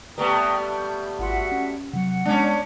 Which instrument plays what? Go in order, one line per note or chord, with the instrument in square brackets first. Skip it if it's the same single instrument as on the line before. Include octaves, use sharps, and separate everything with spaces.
[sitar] G3 A3 B3 [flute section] G4 A#5 D#6 [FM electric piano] B4
[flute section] G6
[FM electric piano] G#1 F4 C6 [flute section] F#4 E5 F#5
[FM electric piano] C#4
[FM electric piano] C3 F#3 [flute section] F#5
[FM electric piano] G#3 B3 [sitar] C#4 D4